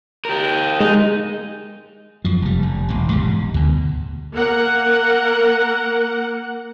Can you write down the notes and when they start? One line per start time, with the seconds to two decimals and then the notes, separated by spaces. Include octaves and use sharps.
0.25 G4 A#4
0.80 G#3 D#4
2.25 F#2 F3
2.42 F1 G3
2.63 F1
2.89 E1 A1
3.11 E1 G#2 G3
3.54 D2 B2
4.32 A#3 A#4 F#5